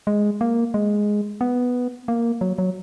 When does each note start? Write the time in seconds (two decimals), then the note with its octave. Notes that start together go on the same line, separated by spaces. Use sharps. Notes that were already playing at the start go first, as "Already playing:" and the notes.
0.07 G#3
0.41 A#3
0.74 G#3
1.41 B3
2.08 A#3
2.41 F#3
2.58 F#3